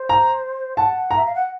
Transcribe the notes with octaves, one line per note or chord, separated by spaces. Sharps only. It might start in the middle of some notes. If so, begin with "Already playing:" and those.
Already playing: C5
A#5
F#5 A5
A#5
E5
F5
F#5